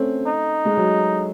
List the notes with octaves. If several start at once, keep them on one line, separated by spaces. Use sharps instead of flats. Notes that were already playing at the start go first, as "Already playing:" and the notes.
Already playing: A3 C4 C#4
D#4
G#3
F#3